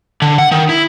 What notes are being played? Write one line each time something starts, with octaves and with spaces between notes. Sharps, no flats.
D3
F#5
D#3
E4